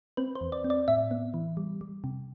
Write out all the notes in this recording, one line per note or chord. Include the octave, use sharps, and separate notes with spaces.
C4 B4
C5
E2
D5
C4
D5
A2 E5
B3
E3
G3
G3
C3